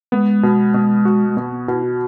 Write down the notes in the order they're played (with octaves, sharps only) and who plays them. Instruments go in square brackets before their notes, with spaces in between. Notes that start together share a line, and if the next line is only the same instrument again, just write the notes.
[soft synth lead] G#3 [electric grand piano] B3
[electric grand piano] B2
B2
F#4
[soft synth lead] G#3
[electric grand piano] B2 [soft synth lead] B3
[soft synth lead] B3
[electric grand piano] B2 [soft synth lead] E4
[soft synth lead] F#4